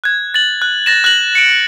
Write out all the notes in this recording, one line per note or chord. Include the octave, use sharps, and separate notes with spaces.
F#6 G#6
A6 F#7
F#6
A6 A#6 E7
F#6 A#6 F#7
C#7 D7